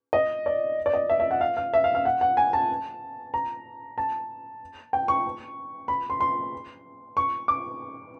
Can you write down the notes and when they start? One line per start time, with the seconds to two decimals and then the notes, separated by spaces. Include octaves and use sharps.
0.13 D#5
0.46 D5
0.86 D5
0.94 D#5
1.10 E5
1.20 E5
1.31 F#5
1.41 F5
1.57 F5
1.74 E5
1.84 F5
1.95 F5
2.05 F#5
2.21 F#5
2.37 G#5
2.53 A5
3.34 A#5
3.98 A5
4.93 G5
5.08 C#6
5.88 B5
6.10 C6
6.20 C6
7.17 C#6
7.48 D6